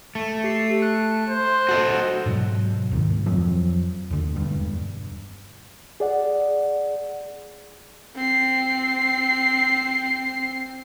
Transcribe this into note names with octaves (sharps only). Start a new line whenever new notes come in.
A3
G4 C7
F#6
C5
F#4 A4 D#5
G#2 B2 F#3
D2 G#2 C3 D#3
F2 F3 F#3 C4
D#2 D3
E1 G2
G#4 D5 F#5
C4 C7